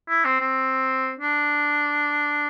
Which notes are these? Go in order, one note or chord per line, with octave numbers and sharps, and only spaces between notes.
E4
C4
C4
D4